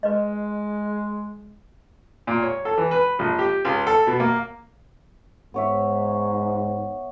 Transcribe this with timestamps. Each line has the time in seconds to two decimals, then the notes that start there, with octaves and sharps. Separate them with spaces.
0.03 G#3 B4 D#5
2.27 A#2
2.42 C#5
2.65 A4
2.78 E3
2.91 B4
3.19 A#1
3.39 G4
3.65 C#2
3.87 A4
4.07 B2
4.20 A#3
5.54 G#2 B3 C#5 E5